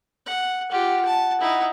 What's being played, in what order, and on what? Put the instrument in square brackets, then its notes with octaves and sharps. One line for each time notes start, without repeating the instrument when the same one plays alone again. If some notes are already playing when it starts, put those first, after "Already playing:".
[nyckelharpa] F#5
[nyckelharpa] F4 G4 [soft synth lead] F#5
[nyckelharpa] A5
D#4 E4